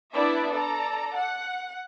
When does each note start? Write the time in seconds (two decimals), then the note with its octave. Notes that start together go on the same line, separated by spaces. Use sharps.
0.14 B3 D4 E4 D5 E5
0.52 A4 D5 A#5
1.15 F#5